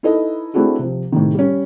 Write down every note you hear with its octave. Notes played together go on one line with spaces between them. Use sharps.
D#4 E4 A4 B4 D#5
A3 C4 D4 E4 F#4 G#4
C3 F3
A2 C3 D#3
G3 C#4